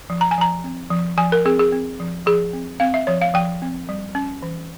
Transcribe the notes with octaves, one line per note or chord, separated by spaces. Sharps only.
F3
A#5
G#5
F3 A#5
C4
F3
F3 G#5
A#4
C4 G#4
G#4
C4
F3
F3 G#4
C4
C4 F5
E5
F3 C#5
F5
F3 G5
C4
G3
C#4
E3